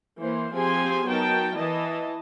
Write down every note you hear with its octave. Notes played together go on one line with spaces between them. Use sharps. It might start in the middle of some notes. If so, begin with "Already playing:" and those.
E3 A#3 C5
F3 C4 G4 G#4 G#5 C6
F#3 B3 D#4 A#4 G5 A5
E3 E4 D#5 A5